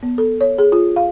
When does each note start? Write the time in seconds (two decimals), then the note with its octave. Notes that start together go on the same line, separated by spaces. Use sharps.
0.03 B3
0.18 A4
0.41 C#5
0.58 G#4
0.72 F4
0.96 F5